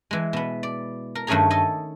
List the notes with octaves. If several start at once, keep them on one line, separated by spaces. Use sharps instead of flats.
E3 G#3
B2 B3
D5
A#4
G2 D#3 A3 C#4 G#4 A#5
A4 D#5 G#5